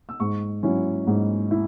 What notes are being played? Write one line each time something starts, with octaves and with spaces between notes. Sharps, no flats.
E6
G#2 C#6
F#3 C#4 E4
G#2
E4